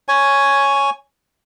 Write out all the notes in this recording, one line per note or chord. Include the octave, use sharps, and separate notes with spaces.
C#5 G#5